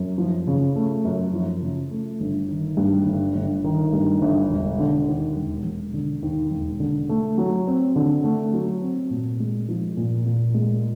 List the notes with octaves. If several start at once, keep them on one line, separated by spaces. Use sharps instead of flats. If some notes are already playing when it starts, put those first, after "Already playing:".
Already playing: F#2
F3
C#3
A3
F#2
F3
C#3
A3
G1
D#3
G2
G1
G1
D#3
G2
G1
E1
D3
D#2
E1
E1
D3
D#2
E1
D3
A3
F#3
C4
D3
A3
F#3
C4
A#2
G#3
F3
A#2
A#2
G#3